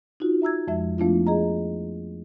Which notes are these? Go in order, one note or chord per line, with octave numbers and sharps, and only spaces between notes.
D#4 F4 F#4
E5 A#5 E6 G#6
F2 F3 G#3 E5
F3 A3 B3 D4 E4 F4
G#4 D#5 A#5